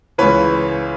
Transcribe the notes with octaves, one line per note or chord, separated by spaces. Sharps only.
C#2 C#3 E3 B4 C#5